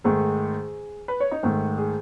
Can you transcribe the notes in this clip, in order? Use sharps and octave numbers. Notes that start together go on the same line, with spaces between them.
G#2 D#3 A3 G#4
B4
C#5
D#4
G#2 D#3 A3
G#4